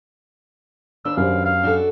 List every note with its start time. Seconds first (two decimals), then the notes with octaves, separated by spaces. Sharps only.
1.05 D#2 D4 B4 E6
1.17 F#2 G4 C5 F5
1.45 F5
1.63 D4 F#4 A4